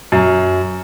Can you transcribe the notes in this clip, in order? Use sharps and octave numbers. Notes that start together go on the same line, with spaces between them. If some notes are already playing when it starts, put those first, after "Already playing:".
F#2